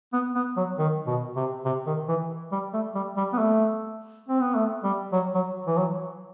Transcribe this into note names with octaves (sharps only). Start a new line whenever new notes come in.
B3
B3
F#3
D#3
B2
C3
C3
D#3
E3
G3
A3
G3
G3
B3
A3
C4
B3
A3
G3
F#3
F#3
E3
F#3